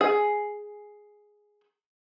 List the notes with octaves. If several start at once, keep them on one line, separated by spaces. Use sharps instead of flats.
G#4 G#5